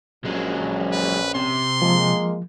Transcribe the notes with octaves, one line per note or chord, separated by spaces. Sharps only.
A#1 F#3 G#3 C#4
B4
C3 C6
F3 G#3 A#3